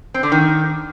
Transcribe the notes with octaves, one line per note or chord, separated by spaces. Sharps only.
C4
D3
D#3